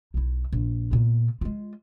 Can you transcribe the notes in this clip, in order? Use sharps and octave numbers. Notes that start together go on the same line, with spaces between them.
B1 E4
A#1
A#2 B3
G#3 F4